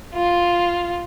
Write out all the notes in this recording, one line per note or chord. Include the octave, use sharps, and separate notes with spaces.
F4